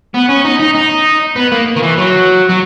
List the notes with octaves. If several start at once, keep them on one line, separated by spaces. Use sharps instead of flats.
B3
C#4
D#4
D#4
D#4
B3
A#3
D#3
E3
F#3
F#3